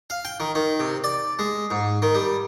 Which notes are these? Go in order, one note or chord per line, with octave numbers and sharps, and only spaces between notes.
F5
G5
D#3
D#3
C3
D5
G#3
G#2
D#3
G3